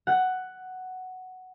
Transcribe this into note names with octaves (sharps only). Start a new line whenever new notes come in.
F#5